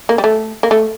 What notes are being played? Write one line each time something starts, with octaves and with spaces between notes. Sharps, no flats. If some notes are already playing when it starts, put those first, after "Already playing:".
A#3
G3
A3
A#3
A3